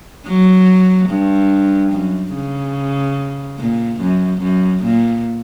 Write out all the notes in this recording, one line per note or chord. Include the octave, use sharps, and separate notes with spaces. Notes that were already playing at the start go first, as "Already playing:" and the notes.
F#3
G2
F#2
C#3
A#2
F#2
F#2
A#2